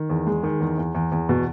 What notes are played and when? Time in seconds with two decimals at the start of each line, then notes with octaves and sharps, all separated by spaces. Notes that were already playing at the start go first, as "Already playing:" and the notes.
Already playing: D#3
0.10 E2
0.27 G#3
0.43 D#3
0.60 E2
0.78 E2
0.95 E2
1.12 E2
1.29 B2